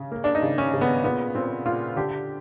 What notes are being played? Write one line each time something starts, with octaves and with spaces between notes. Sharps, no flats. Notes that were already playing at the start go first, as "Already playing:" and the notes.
Already playing: C#3
A#3
D4
D#4
C#3
C#4
C#3
B3
A#2 B3
A#2 C4
A#2 F4
D3 G4